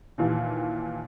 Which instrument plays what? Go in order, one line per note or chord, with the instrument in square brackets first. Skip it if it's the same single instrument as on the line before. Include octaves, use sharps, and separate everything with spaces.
[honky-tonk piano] D#2 A#2 E3